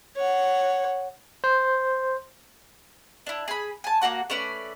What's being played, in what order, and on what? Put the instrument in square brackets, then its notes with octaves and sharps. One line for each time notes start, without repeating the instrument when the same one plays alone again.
[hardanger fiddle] C#5 F#5
[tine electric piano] C5
[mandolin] D4 E4
G#4 B5
G#5 A5
A#3 E4 F#4 F#5
A3 C#4 B4 D5